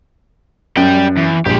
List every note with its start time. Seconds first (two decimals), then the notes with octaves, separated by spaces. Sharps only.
0.77 F#2 G3 G5
1.17 E2
1.46 A#1 G#3 G4